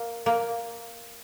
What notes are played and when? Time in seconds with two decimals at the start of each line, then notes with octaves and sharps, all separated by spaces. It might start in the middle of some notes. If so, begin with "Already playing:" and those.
Already playing: A#3
0.26 A#3